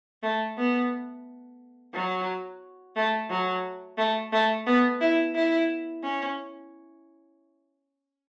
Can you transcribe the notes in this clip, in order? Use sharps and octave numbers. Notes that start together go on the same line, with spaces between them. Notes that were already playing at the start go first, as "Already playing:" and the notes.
A3
B3
F#3
A3
F#3
A3
A3
B3
E4
E4
C#4